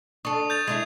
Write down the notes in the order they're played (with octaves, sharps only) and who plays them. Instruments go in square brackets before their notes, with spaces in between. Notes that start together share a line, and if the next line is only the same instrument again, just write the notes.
[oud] D4 A4 [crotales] C#6 D#6
[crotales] G6 A6 F7
[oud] G#3 D4 E4 [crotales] G#6